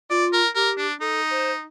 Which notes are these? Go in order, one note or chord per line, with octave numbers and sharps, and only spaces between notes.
F4 D5
A#4
G4 A#4
D4
D#4 A4
C5